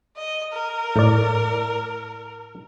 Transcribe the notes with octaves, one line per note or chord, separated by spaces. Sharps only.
D#5
A#4
A2 D5